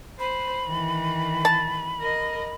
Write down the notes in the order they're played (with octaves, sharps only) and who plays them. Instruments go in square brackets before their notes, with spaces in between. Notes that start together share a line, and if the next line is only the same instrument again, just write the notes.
[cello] C5 [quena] B5
[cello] D#3 E3
[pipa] A5
[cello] A#4 D#5